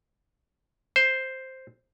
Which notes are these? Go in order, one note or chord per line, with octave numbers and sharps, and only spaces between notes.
C5